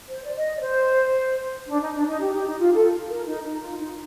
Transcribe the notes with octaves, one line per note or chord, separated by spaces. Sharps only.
C5
D5
D#5
D5
C5
D4
D#4
D4
D#4
G4
G4
D#4
F4
A4
A#4
D#4
D#4
F4
D#4